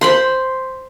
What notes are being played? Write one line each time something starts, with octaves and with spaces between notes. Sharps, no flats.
C5 B5 C6